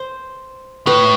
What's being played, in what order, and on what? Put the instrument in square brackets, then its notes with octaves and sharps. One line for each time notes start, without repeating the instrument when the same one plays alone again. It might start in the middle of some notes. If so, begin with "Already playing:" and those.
Already playing: [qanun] C5
[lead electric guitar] A2 [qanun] B4